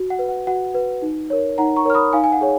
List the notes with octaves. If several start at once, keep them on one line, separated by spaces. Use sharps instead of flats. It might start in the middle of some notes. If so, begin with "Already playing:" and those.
Already playing: F#4
F#5
B4
F#5
F#4 F#5
B4
D#4
A#4 C#5
D#4 F#5 A#5
A#5 C#6
A#4 C#5 F6
B5 D#6
D#4 F5 G#5
G#5
F#5
G#4 C#5